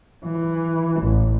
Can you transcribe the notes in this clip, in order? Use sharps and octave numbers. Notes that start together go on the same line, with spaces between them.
E3
A1